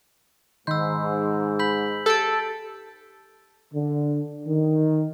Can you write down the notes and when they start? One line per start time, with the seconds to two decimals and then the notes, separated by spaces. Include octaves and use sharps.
0.67 G#2 D#3 B5 C6 E6 G6
1.59 B5 G6 B6 F#7
2.06 G4 A4 A6 D7
3.74 D3
4.46 D#3